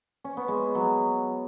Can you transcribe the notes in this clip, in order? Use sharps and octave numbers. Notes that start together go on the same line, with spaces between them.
C#4
B3
G#3
F#3